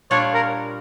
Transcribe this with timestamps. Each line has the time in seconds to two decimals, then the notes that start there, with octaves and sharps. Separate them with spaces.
0.11 A#2 G3 D4 F4 C#5
0.34 A#4